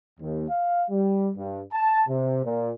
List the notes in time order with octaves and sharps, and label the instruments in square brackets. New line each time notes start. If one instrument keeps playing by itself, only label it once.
[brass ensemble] D#2
F5
G3
G2
A5
C3
A#2